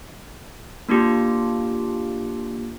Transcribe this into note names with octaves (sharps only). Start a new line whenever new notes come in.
A#3 D4 F4 G4